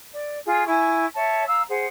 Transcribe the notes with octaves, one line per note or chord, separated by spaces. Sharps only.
D5
F4 G#4
E4 G#5 C#6
C#5 E5 A5
F5 A#5 E6
G#4 C5 F#5